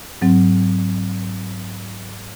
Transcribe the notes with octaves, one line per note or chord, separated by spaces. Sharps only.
G#2 F#3 C4